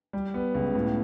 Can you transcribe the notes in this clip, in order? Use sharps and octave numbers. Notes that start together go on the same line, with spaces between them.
G3
B3
C#2
A2